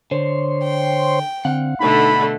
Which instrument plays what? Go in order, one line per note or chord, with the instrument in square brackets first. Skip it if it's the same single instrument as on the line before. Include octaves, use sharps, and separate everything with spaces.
[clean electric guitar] D3 [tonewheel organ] C5 C#5 C6
[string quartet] G5
[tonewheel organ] D3 C4 [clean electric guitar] F5 F#5
[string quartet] B2 D3 A3 [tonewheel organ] D#4 [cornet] B5